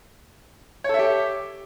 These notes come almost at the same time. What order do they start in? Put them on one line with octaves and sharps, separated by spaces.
C#5 A4 E5 G4